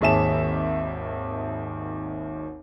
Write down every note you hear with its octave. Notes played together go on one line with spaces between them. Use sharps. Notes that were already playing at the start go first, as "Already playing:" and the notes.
G#1 D#2 G#4 E5 A5 E7